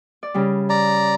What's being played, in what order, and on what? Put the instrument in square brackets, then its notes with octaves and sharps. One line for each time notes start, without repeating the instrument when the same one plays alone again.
[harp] D5
C#3 G3
[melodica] D5 A#5